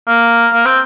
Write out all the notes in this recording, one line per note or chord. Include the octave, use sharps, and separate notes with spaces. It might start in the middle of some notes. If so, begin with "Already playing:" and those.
A#3
A#3
C4